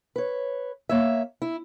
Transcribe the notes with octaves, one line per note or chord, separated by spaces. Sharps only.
B4 C#5
A#3 C#5 E5
E4